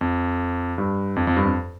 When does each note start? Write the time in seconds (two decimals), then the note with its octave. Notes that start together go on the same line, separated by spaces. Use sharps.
0.01 F2
0.78 G2
1.16 F2
1.27 F2
1.37 G2
1.45 F2